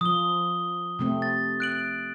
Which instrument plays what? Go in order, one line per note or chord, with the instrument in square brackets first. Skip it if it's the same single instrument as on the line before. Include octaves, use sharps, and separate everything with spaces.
[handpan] F3 [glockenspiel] D#6 G7
[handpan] C3 A3 C4
[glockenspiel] A6
F#6 D7 F#7